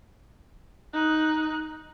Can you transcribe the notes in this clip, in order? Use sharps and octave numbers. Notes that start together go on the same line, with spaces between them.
D#4 F#6